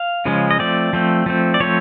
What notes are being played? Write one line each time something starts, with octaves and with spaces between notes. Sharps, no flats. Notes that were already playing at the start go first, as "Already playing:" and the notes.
Already playing: F5
C#3 F3 G#3 C#4
D#5
F3 A3 C4 D5
F3 A3 C4
F3 A3 C4
D5
F3 A3 C4 C#5